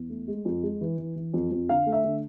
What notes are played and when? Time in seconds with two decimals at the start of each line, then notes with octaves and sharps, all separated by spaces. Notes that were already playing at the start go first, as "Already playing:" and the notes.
Already playing: E2
0.10 A3
0.28 G#3
0.45 F2
0.63 G#3
0.81 E3
0.98 E3
1.16 E3
1.34 F2
1.51 F2
1.69 D3 F5
1.87 A3
1.92 E5
2.04 D3